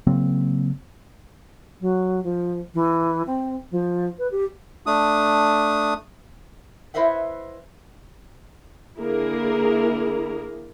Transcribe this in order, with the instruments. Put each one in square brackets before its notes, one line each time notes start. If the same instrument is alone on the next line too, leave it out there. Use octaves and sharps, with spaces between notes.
[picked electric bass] C#3 F#3 A#3 C4
[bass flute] F#3
F3
E3
C4
F3
B4
G4
[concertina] A3 D4 D#6
[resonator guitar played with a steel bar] E4 B4 C5 D#5 E5 F#5
[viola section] D3 A#3 E4 G#4 A#4